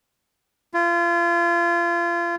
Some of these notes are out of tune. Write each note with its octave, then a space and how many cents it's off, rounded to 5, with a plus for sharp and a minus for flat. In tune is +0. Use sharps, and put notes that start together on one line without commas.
F4 -30